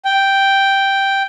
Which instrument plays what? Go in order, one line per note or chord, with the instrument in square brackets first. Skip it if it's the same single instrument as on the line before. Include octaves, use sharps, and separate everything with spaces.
[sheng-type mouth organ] G5